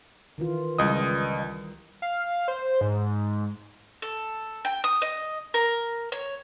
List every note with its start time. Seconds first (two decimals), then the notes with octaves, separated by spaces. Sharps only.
0.38 D#3 E3 F4
0.78 C#2 E3 G3 D#5 D#6
2.02 F5
2.48 C5
2.81 G#2
4.02 A4
4.65 G5
4.84 D#6
5.02 D#5
5.54 A#4
6.12 C#5